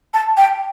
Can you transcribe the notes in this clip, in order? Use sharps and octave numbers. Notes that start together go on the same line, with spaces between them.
A5
G5